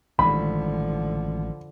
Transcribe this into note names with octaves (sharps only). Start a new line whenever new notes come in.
A1 D3 D#3 F3 G#3 B5